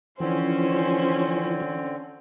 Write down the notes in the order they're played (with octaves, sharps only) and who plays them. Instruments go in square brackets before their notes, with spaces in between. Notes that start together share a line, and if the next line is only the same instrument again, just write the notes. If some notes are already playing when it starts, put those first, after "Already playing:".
[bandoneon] D3 C4 [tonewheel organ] E3 F3 [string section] C#4 [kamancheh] C5